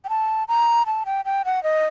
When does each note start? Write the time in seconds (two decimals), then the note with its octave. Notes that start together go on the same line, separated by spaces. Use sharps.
0.05 G5
0.09 A5
0.48 A#5
0.86 A5
1.06 G5
1.25 G5
1.45 F#5
1.63 D#5